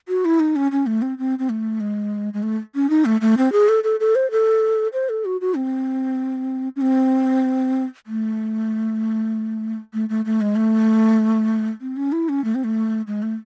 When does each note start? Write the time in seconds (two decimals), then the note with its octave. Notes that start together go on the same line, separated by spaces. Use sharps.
0.08 F#4
0.25 E4
0.40 D#4
0.56 C#4
0.72 C#4
0.86 A3
1.02 C4
1.18 C4
1.39 C4
1.49 A3
1.81 G#3
2.34 G#3
2.43 A3
2.75 C#4
2.90 D#4
3.05 A3
3.21 A3
3.38 C4
3.52 G#4
3.69 A4
3.84 A4
4.00 A4
4.15 C5
4.31 A4
4.93 C5
5.09 A4
5.25 F#4
5.41 F#4
5.56 C4
6.76 C#4
6.81 C4
8.07 A3
9.94 A3
10.09 A3
10.25 A3
10.41 G#3
10.56 A3
11.81 C4
11.96 C#4
12.12 E4
12.29 C#4
12.44 A3
12.55 C4
12.65 A3
13.07 G#3
13.23 A3